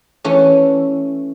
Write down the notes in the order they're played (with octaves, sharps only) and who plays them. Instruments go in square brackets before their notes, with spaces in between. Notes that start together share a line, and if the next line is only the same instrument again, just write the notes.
[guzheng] E3 A3 C#4